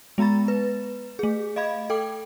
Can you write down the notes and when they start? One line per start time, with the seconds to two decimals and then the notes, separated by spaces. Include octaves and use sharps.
0.18 G#3 B3 A#5 B5 A6
0.48 B4
1.19 A3 G#4
1.56 D#5 F5 B5 G#6
1.90 A4 G5 D6